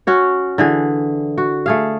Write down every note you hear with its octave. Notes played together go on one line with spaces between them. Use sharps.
C#4 F#4 C#5
D3 E3 G#4
F#4
A3 G#4 F5